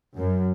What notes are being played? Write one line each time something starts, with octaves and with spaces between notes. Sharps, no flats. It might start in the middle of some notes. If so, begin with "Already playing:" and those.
F#2